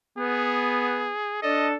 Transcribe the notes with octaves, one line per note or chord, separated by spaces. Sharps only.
B3 G#4
D4 A4 D#5